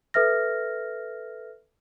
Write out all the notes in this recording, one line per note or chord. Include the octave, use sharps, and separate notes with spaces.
A4 B4 E5 F6 A#6